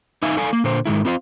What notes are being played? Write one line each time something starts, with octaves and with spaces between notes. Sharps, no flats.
D#4 E5 F5 G#5
A4 D5 F5 G#5
A#3
A#2 D3 C5
G#2 D#3 G#3 E4
C4 F4 C5 E5 F5